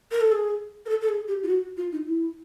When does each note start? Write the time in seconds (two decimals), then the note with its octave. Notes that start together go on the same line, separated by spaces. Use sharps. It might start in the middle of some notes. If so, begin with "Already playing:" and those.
0.12 A#4
0.21 A4
0.32 G#4
0.86 A#4
0.89 A4
1.01 A4
1.09 G#4
1.28 G4
1.43 F4
1.48 F#4
1.77 F4
1.92 D#4
2.06 E4